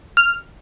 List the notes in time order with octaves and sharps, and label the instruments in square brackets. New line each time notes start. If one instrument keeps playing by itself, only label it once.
[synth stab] F6